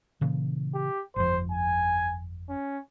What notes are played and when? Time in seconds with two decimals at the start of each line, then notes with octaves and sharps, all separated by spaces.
0.21 A#2 C#3 E3
0.74 G4
1.16 G1 F2 C5
1.51 G#5
2.49 C#4